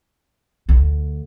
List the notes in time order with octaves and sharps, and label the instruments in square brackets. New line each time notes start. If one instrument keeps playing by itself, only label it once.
[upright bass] D2